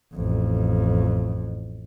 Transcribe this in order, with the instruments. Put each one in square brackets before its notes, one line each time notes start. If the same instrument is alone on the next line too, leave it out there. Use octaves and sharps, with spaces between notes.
[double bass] A1 F2